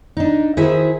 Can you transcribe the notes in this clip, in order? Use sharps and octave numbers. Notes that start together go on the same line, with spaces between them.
D4 D#4
D#3 E4 F#4 G#4 C5 E5